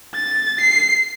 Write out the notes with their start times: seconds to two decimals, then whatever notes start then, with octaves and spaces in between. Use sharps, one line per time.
0.15 A6
0.61 C7